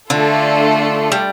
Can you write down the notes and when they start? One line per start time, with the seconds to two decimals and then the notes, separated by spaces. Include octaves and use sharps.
0.10 D3 A3 D4 F4 A4
1.12 G3